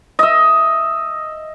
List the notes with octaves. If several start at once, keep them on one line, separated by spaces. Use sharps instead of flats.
D#5 E5